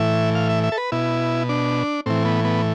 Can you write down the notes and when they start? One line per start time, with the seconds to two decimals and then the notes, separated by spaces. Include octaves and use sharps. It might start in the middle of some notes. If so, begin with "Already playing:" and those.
Already playing: A2 E3 E5
0.35 F5
0.49 E5
0.63 E5
0.72 A4
0.78 B4
0.92 B2 E4
1.49 D4
2.06 A2 E3 C4
2.25 B3
2.44 B3